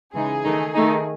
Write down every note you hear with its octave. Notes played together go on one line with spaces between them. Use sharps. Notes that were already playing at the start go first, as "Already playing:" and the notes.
C#3 E3 G#3 D#4 G#4
D#3 A3 D#4
D#3 A3 D#4